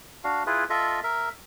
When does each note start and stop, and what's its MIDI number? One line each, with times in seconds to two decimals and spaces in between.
0.24 0.44 62
0.24 0.44 66
0.24 0.44 77
0.46 0.64 64
0.46 0.64 65
0.46 0.64 68
0.46 0.64 71
0.70 1.00 65
0.70 1.00 69
0.70 1.00 75
0.70 1.00 76
1.03 1.29 70
1.03 1.29 76